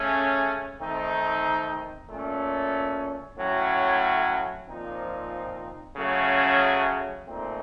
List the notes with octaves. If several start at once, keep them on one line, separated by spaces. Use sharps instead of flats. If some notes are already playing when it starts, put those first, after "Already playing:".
Already playing: C#3 A3 C#4
D#3 A3 C4 D#4
A#2 A3 C#4
A2 F#3 A3 C#4
A#2 F3 C4 D#4
C#3 F#3 A3 C#4
A#2 A3 C4 D#4